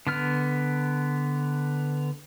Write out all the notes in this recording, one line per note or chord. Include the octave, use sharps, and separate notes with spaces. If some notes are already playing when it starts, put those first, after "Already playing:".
D3 B3 F6